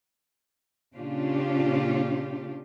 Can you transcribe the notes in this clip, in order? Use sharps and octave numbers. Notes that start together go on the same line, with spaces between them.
A#2 C#3 C#4 D4 F4 G4